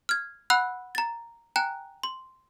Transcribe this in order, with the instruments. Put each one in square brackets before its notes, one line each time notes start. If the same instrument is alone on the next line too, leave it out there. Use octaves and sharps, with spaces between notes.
[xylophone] F6 G#6
F#5 B5 E6 F#6
A#5 A6
G5 G#5 A#5 F#6
C6